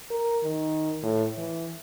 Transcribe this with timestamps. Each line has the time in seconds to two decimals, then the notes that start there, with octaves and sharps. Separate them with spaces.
0.11 A#4
0.44 D#3
1.03 A2
1.38 E3